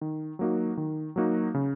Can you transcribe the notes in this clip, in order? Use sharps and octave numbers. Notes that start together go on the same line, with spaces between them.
D#3
F#3 A#3 D#4 F#4
D#3
F#3 A#3 D#4 F#4
C#3